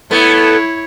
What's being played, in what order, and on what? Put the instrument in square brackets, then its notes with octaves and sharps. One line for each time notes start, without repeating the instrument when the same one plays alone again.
[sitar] A3 B3 [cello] E4 C#5